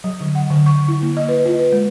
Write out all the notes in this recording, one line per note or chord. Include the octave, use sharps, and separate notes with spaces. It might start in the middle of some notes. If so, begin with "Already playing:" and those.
F#3
D3
F#5
D3
C#6
E4
A#3
D#5
B4
F4
B4
G#3